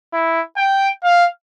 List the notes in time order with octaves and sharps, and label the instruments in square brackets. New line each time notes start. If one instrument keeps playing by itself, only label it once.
[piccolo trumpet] E4
G5
F5